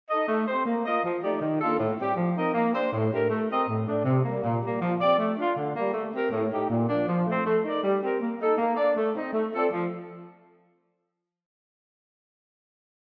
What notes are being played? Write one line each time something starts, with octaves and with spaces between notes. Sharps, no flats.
D#4 A4 D#5
A3
C4 G4 C5
A#3
F4 A#4 D#5
F3
A3 D#4 G4 D5
D#3
A#3 D4 F4 A4
A2
G3 C4 G4
F3
C4 D#4 A#4 D#5
A#3
D4 G4 C5
A2
A3 D4 G4 A#4
A3
C4 G4 A#4 D#5
A2
A3 D4
C3
G3 A#3
A#2
G3 A#3
F3
C4 G4 D5
A3
D4 F4
D3
G3 A#3
A3
C4 G4 A#4
A2
A3 D#4 G4
A#2
F3 A#3 D4
F3
A3 C4
A3
D#4 A#4 D5
G3
C4 G4 A#4
A#3
D#4 A4
A#3
D4 A4 D5
A3
C4 D#4
A3
C4 F4 A4 D5
F3